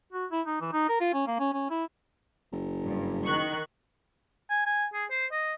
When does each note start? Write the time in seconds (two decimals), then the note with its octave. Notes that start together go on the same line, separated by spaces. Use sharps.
0.13 F#4
0.31 E4
0.46 D#4
0.61 E3
0.73 D#4
0.89 A#4
1.01 F4
1.14 C#4
1.27 A#3
1.40 C#4
1.53 C#4
1.71 E4
2.52 F#1
2.85 G2
3.24 D#3 C#6 F#6
4.50 G#5
4.66 G#5
4.93 G#4
5.10 C5
5.31 D#5